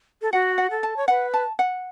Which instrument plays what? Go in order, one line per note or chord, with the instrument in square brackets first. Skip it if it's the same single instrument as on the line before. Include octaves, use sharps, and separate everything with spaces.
[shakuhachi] A4
[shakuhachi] F#4 [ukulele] F#5
[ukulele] F#5
[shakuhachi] A4
[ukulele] A5
[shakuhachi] C#5
[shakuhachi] B4 [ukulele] F#5
[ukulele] A5
F#5